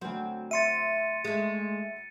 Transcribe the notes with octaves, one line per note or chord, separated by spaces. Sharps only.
D2 F#3 C4
E5 C6 A6 C#7 D#7
G#3 A3